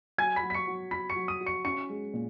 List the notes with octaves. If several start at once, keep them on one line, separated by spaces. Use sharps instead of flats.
F#3 G#5 G#6
B5 B6
F#3
B6
C#6 C#7
F#3
F#4 B5 B6
C#6 C#7
F#3
D#6 D#7
F#4
C#6 C#7
C#4 C#6 C#7
G#3
A#2